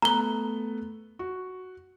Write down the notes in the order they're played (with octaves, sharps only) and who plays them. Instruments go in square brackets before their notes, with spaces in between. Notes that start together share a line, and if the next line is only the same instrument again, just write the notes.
[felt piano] A3 B3 [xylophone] A#5 G7
[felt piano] F#4